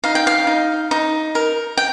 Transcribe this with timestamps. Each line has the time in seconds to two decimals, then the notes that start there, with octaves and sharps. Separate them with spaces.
0.04 D#4 F5
0.15 G5
0.27 F5
0.47 D#4
0.91 D#4
1.35 A#4
1.77 G5